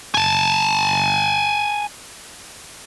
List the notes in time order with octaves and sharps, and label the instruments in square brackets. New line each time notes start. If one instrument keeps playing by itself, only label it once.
[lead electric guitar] G#5 A5